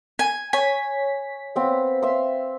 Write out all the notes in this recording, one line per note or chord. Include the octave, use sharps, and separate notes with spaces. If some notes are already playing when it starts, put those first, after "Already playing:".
G#5
C#5 G#5 B6
B3 C4 F5
E5 F5 C6